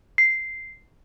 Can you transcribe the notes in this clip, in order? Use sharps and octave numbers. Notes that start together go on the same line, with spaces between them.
C7